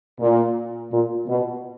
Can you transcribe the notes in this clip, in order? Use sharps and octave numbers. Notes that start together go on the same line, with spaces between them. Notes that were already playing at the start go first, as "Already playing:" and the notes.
A#2
A#2
B2